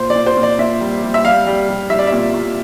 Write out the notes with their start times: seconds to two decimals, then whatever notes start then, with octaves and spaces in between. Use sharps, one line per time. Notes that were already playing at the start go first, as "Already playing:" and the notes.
Already playing: A#2 C5
0.10 D5
0.15 A#2
0.26 C5
0.37 A#2
0.43 D5
0.59 A#2 E5
0.81 G3
1.03 G3
1.14 E5
1.25 G3 F5
1.47 G3
1.68 G3
1.90 G3 E5
1.99 D5
2.07 A#2 E5
2.34 A#2